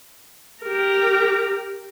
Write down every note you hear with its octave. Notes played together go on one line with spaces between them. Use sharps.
G4 A#4